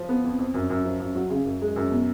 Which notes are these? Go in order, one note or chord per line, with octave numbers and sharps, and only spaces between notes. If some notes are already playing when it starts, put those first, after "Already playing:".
Already playing: F3
B3
F2
F2
F#2
F#2
F3
F#2
F#3
C#3
F#2
G#3
F#2
B2